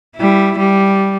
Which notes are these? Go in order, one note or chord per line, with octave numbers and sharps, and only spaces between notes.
G3 E4
G3